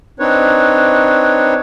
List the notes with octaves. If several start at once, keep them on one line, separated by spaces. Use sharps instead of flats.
C4 D4 D#4 B4 C#5